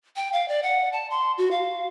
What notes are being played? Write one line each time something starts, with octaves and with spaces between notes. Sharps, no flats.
G5
F5
D5
F#5
A5
C6
F#4
F5